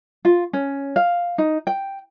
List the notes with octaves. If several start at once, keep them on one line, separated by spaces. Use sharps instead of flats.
F4
C#4
F5
D#4
G5